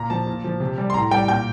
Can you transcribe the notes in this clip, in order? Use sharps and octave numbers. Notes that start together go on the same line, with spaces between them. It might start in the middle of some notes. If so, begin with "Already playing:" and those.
Already playing: A#2 A#5
F3 A5
A#2
F3
C3
G3
C6
A2 A#5
G3 G5
A#2 G5